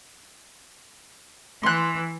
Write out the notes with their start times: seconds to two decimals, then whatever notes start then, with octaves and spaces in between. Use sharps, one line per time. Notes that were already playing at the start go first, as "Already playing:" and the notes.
1.63 E3 C6 F#6